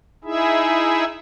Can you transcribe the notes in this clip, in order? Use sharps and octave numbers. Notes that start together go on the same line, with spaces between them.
D#4 E4 G#4 E5